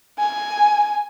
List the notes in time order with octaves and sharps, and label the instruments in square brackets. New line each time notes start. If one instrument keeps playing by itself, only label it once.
[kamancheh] G#5